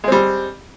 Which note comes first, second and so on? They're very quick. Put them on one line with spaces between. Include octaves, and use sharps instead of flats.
G#3 C4 G3